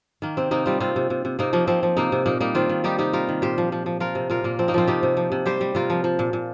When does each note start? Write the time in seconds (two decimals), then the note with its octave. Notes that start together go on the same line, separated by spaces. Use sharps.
0.22 D#3 A#3
0.37 C3 C4
0.51 C3 A#3 D#4
0.66 G3 C4 F4
0.80 C3 C4 F4
0.96 C3
1.10 C3
1.25 C3
1.39 C3 A#3 D#4
1.53 F3 A#3
1.67 F3 C4
1.83 F3
1.97 C3 A#3 D#4
2.12 C3
2.26 A#2 A#3 D#4
2.41 G3 A#3 D#4
2.55 D#3 C4 F4
2.69 D#3
2.84 G3 D#4 G4
2.98 C3 D#4 G4
3.13 G3 F4 A#4
3.29 D#3
3.42 A#2 G4 C5
3.58 F3
3.72 F3
3.86 F3
4.00 F3 F4 A#4
4.15 C3
4.30 A#2 F4 A#4
4.44 A#2 A#3
4.59 F3 C4
4.68 A#3 D#4
4.74 F3 C4 F4
4.87 C3 D#4 G4
5.03 C3
5.17 F3
5.32 C3
5.46 G3 G4 C5
5.61 G3
5.75 C3 F4 A#4
5.90 F3
6.04 F3
6.19 A#2
6.33 A#2